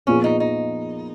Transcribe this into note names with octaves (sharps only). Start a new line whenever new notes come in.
A#2 F3 B3 C#4 F4 G#4
D#4
D#4